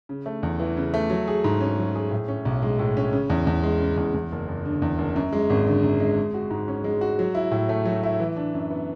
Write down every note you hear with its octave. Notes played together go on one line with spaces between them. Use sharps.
C#3
A3
E2
E3
C#3
A3
F#3
G#4
G#2
C#4
F#3
G#4
A2
C#4
B1
G#3
A2
C#4
C#3
E2
E2
G#3
C#3
E2
E2
F#1
F#1
D3
E2
F#1
F#2
G#3
G#1
D3
F#2
G#3
G#3
F#4
G#2
C#4
G#3
F#4
F#3
E4
A2
A3
F#3
E4
E3
D4
F#2
B3